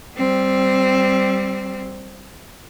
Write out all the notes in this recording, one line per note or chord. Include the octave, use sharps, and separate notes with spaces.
G3 C4